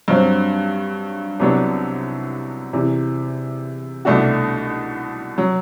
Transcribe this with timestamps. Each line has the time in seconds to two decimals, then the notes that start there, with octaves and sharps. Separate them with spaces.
0.08 G2 F#3 C4
1.40 C2 C3 F#3 B3 D4
2.73 E2 C3 E3
4.05 C2 B2 A3 D4 F#4
5.38 F#3